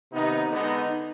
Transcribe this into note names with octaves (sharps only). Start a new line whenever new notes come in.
C3 D#3 B3 D#4
D3 G#3 B3 D#4